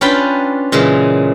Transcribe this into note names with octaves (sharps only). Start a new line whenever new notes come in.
C#4 D4 F4 B4 G5 B5
A#2 C#3 E3 G#3